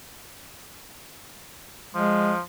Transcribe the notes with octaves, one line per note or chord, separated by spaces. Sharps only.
F3 G#3